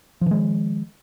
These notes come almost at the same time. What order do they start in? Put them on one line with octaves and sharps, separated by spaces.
F3 D#3 G#3